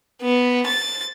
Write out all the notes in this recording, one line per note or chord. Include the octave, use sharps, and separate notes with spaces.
B3
A6